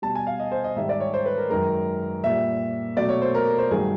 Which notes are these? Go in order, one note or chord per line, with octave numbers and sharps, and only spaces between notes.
B2 G3 A5
G#5
F5
D#5
C5
D#5
G#2 D#3 G3 E5
D5
C#5
C5
B4
A#4
F#2 D#3 G#3 A#4
A#2 G3 E5
B2 F#3 A3 D5
C#5
C5
A#4
C5
G2 D#3 F#3 A3 G#4